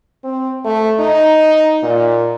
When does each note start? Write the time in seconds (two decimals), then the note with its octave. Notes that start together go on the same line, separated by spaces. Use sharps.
0.24 C4
0.64 A3
1.00 D#4
1.83 A#2